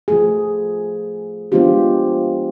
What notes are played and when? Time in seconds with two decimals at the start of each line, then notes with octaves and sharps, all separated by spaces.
0.08 F3 A3 G#4
1.52 F3 G#3 B3 D4 F4 G4